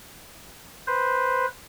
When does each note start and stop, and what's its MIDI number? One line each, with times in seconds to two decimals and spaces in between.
0.87 1.46 71
0.87 1.46 72